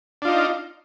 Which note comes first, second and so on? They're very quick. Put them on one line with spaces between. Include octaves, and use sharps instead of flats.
D4 F4 D#4